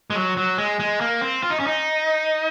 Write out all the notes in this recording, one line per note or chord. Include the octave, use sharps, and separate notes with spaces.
G#3
F#3
F#3
G#3
G#3
A#3
C4
F4
D#4
C#4
D#4